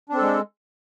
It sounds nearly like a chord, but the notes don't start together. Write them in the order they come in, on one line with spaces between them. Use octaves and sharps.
D4 C4 A4 G#3